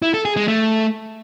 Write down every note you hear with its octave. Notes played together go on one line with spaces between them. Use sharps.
E4
A4
G#4
G#3
A3